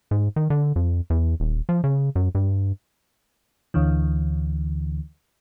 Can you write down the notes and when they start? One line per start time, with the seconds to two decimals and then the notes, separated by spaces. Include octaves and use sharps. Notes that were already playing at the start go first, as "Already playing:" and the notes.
0.11 G#2
0.36 D#3
0.50 D3
0.76 F2
1.10 E2
1.40 D#1
1.69 F3
1.84 C#3
2.15 F#2
2.35 G2
3.74 D2 D3 E3